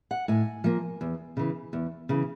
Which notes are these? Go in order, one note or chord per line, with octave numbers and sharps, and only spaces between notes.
F#5
A2 G#5
F3 A#3
E2
C#3 E3
E2
C#3 E3